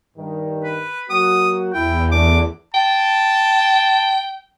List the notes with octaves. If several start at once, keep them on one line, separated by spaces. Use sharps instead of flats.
G2 D#3
B4
F#3 A#3 F#4 D#6
E2 E4 G5
A3 D4 D6
G5 A5